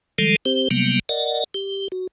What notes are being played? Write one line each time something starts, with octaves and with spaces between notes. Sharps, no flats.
D#3 F3 G3 G#3 A4
C4 G4 C5
C3 F#3 G3 A#3 B3
A#4 D5 D#5 F#5
G4
F#4